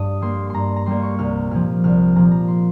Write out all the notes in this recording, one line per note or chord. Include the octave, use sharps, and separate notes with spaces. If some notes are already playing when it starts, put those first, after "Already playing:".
Already playing: G2 D#6
G3 A#3 C6
G2 A#5 C6
A#5
G3 A#3 C6
C#6
C2 F6
A#2 F3 F6
C2 F6
A#2 F3 A#5
A#5
C6